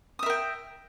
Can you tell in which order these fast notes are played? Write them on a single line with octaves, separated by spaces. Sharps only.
D#6 E5 A#4 G5